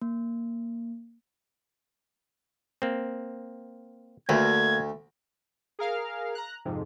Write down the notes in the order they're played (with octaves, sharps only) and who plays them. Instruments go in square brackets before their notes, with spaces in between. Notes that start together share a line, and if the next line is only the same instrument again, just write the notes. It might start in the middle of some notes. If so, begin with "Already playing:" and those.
[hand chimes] A#3
[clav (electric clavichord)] A#3 C4
[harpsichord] D2 [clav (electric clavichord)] A3 A#3 B4 [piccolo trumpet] G#6
[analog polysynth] G#4 A#4 F5 F6
A#5 F#6
F2 G#2 C3